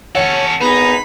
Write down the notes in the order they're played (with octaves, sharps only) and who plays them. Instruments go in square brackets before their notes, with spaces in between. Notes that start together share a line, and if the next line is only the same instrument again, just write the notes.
[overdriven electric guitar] C#4 A4 [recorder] C#5 [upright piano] F#5
[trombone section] G#1 B3 G#4 [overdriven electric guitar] D#4 [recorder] B5